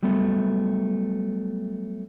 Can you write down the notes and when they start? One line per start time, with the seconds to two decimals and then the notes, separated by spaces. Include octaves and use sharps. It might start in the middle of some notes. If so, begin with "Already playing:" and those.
0.03 F#3 G3 A3 B3